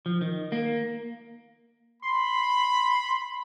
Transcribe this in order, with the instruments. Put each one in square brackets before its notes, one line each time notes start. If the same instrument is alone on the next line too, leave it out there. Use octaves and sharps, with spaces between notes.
[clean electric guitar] F3
D#3
A#3
[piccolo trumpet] B5 [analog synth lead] C6